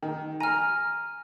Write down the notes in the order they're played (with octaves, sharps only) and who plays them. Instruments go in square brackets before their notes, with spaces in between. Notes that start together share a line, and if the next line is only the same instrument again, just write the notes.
[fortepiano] D#3
[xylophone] G#5 F6 [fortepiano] A#5